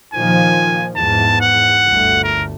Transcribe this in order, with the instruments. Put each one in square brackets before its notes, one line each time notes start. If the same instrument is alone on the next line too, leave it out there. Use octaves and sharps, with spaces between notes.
[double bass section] A#2 D#3 F3 [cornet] G#5
[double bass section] E2 G#2 [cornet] A5
[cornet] F#5
[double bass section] G1 D2 A3
[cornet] A#4